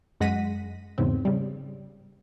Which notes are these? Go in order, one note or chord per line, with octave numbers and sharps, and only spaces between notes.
F#2 G#3 F#5 A#6 B6 D#7
E2 G#2 C#3 C4
C#3 G3